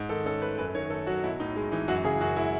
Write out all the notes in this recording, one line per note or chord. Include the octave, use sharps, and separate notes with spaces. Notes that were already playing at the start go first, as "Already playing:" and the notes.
Already playing: G#2
D#3 A4
C#4 A4
A3 B4
F#2 B4
D#3 C#5
A3 A4
F#3 F#4
B1 E4
A2 D#4
G#3
E3 D#4
F#2 F#4
C#3 G#4
F#2 F#4
G#3 E4